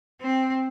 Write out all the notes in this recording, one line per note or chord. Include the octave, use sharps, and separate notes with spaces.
C4